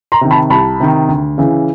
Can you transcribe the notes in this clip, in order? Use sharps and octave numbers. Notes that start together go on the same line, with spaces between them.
A#5 C6
C3 D#3
A5 B5
C2 A5 B5
C3 D#3
D2
C#3 E3